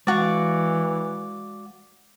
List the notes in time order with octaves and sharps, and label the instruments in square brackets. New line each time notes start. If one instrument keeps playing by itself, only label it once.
[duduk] E3 [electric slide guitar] G#3 F5 [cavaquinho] F#4 D5